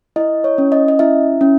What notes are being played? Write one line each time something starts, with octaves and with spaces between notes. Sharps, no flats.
E4 D#5
C#5
C#4
D#5
D#5
E4 E5
C#4